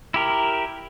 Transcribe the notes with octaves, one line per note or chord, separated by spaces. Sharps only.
E4 G4 A#4